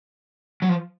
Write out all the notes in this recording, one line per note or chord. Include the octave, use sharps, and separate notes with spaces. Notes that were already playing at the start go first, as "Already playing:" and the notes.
F#3
F3